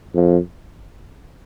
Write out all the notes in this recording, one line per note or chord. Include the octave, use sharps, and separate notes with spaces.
F2